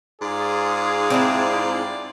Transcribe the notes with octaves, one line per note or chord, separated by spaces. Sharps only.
G#2 F4 G#4 D5
C4 D4 E4